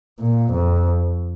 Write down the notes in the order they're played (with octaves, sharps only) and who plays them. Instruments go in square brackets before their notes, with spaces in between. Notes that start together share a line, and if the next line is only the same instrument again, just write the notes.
[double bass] A#2
F2